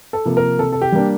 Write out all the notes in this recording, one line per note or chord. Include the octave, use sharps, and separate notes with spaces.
A4
C3 F3 A#3
A#4
C3 A4
A4
G4
G3 A#3 D4